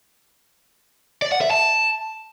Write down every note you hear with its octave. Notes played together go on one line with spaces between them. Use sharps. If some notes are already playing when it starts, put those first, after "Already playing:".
D5
F#5
E5
A5